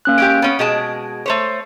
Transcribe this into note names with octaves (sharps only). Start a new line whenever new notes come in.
A#3 C#4 F#6
G#3 C#4 G4 D7
B3 C#4
B2 G#3 A5
A3 C5 C#5